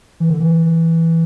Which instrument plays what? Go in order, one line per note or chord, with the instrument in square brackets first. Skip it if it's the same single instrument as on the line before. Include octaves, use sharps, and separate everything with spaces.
[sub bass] E3
D3
E3